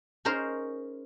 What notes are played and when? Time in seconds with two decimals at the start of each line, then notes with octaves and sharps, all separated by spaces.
0.25 C#4 D#4 G#4 A#4 C5